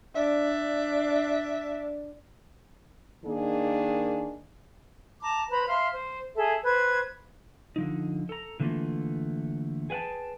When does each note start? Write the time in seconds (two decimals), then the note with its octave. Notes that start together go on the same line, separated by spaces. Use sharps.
0.15 D4 E5
3.25 D#3 A#3 D4 G#4
5.21 A5 A#5 D6
5.51 B4 C5 A#5 B5
5.68 E5 F5 C6 F6
5.94 C5
6.36 G#4 A4 E5
6.64 B4 C5 G#6
7.76 D3 F3 D#4
8.29 A4 A#5
8.60 D3 E3 A3 A#3 F4
9.90 G#4 B4 F#5 G5 A5